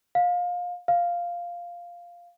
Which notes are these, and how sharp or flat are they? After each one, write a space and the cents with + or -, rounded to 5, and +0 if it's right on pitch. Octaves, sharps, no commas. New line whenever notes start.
F5 +25
F5 +0